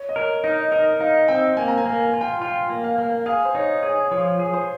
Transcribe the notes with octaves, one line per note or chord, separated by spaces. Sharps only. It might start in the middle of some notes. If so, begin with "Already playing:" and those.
Already playing: C#5
D#5
A#4 C#5
D#4 D#5
A#4 D#5
D#4 F5
C4 G5
A#3 G#5
A#5
G#5
A#3
G#5
F4
G5
F4 G5
A#3
F5
A#3
G#4 F5
C5
D#4 C#5
G#4 C#5
F3 C#5
G#4
C5